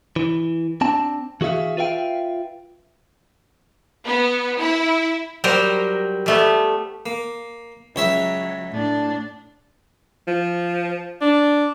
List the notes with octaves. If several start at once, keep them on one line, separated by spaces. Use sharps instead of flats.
E3
C4 D4 A5
E3 F#4 G#4 E5 F5
F4 B4 E5 F5 G5
B3
E4
F#3 G3 A#4 C5 G5
G3 A3 B3
A#3
C#2 F#3 C#5 E5
A2 D4
F3
D4